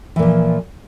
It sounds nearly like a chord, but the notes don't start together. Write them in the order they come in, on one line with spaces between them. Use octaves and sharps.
E3 A#2 F3